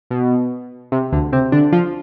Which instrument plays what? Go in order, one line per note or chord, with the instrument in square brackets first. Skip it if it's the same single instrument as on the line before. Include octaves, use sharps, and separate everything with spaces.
[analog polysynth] B2
C3
D2 D3
C3 C4
D3 D4
F3 F4